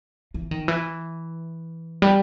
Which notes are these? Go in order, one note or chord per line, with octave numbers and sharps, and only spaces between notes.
E3
D#3
E3
G3